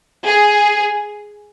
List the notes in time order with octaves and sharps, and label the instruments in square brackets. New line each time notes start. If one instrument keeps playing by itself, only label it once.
[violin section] G#4